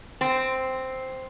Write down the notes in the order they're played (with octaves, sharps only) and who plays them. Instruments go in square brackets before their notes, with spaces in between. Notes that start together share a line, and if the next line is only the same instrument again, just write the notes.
[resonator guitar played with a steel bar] C4